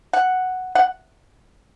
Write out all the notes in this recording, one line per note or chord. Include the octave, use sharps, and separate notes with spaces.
F#5
F#5